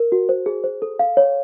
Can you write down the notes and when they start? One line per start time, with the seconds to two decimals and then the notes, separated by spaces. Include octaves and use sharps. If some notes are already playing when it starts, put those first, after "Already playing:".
Already playing: A#4
0.12 F#4
0.29 C5
0.46 G#4
0.64 C5
0.82 A4
0.99 F5
1.17 C#5